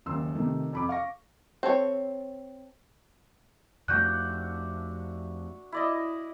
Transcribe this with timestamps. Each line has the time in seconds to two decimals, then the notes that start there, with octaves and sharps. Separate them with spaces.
0.06 F#1 D#2 C6 E6
0.35 C3 D#3 A3
0.73 F2 B5 D6
0.89 F5 C#6 A#6
1.63 C4 A4 C#5
3.88 F2 A3 D4 F#4 E5 F#6 G6
5.72 E4 D5 D#5